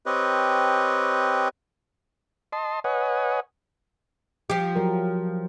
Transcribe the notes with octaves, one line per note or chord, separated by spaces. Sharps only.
C4 G4 B4 C#5 D#5
D#5 A5 C6
B4 C#5 D#5 F#5 G#5
F3 G4
F#3 A#4